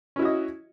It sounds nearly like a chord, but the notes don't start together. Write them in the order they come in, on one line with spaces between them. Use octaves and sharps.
C#4 E4 F#4 D#5